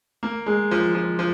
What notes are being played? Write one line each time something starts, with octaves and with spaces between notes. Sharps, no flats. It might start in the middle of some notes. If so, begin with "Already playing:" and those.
A#3
G#3
F3
F3
F3